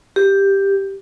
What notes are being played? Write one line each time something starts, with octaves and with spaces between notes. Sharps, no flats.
G4